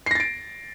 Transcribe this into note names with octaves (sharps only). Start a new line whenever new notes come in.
A6 A#6 C7 D7